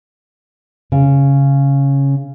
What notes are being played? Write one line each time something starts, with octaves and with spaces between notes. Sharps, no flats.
C#3